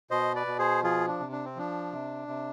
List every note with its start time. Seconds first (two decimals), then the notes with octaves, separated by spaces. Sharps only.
0.11 B2 C5 D#5
0.36 B4 D5
0.47 B2
0.59 G#4 C5
0.83 F3 F4 G#4
1.08 D4
1.20 C3
1.32 D4
1.45 C4
1.56 F3 D4
1.92 C3
2.28 C3